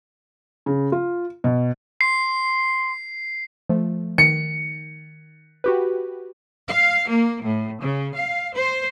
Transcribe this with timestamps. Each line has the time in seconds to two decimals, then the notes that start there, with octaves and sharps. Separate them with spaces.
0.66 C#3
0.92 F4
1.44 B2
2.01 C6 C7
3.69 F3 A3
4.18 D#3 C#7
5.64 F#4 G4 B4
6.68 F5
7.09 A#3
7.43 A2
7.81 C#3
8.15 F5
8.55 C5